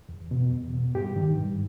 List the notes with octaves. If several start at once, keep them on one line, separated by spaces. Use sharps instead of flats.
E2
B2
E2
B2
G2 G4
D#3
G2